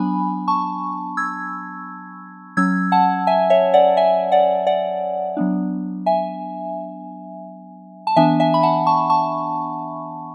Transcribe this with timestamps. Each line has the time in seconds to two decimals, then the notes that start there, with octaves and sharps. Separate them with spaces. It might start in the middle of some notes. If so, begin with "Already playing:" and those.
Already playing: F#3 B3 D4 G#5 B5
0.48 A5 C#6
1.17 E6 G#6
2.57 F#3 C#4 E6 G#6
2.92 F#5 A5
3.27 E5 G#5
3.50 C#5 E5
3.74 D5 F#5
3.97 E5 G#5
4.32 D5 F#5
4.67 D5 F#5
5.37 F#3 B3 D4
6.06 E5 G#5
8.07 A5
8.16 E3 B3 D4 E5 G#5
8.40 E5 G#5
8.54 B5
8.63 F#5 A5
8.87 A5 C#6
9.10 A5 C#6